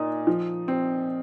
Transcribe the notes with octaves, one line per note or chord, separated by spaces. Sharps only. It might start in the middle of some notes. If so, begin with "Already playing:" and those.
Already playing: A#2 D#4 A#4
F3
C4